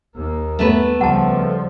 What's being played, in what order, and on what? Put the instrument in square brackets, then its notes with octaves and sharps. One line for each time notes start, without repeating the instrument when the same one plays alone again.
[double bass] D#2 A#3
[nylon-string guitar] A3 B3 B4
[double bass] C#2 F3 [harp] G3 A4 [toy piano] F#5 A5